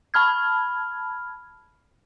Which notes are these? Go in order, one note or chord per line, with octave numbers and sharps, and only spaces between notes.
A5 B5 F6 G#6